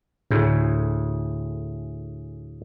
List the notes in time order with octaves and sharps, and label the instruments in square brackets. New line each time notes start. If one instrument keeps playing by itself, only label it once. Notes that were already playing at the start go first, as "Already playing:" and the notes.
[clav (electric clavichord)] D2 A2 [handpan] D3 G#4